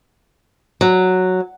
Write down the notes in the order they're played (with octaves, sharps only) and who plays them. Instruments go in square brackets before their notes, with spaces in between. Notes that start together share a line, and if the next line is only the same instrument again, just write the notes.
[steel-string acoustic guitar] F#3